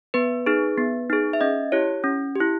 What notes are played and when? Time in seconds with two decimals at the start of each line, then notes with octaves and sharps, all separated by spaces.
0.14 B3 B4
0.46 D#4 G#4
0.78 B3
1.10 D#4 G#4
1.33 E5
1.41 C#4 D#5
1.72 E4 G4 C#5
2.04 C#4
2.35 E4 G4